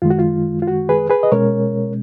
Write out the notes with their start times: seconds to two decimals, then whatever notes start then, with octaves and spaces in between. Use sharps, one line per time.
0.02 F#2 D#3 G#3 F4
0.10 F#4
0.19 F4
0.62 F4
0.67 F#4
0.89 G#4 B4
1.10 G#4 B4
1.23 D#5
1.32 B2 G#3 C#4 A#4 C#5